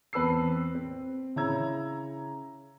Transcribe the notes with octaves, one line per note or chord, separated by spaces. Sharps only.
E2 C4 B4 A5 E6 C7
C4
C#3 E4 C#5 A#5 E6 G#6